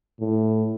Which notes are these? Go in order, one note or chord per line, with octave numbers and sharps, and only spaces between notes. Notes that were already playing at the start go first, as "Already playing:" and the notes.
A2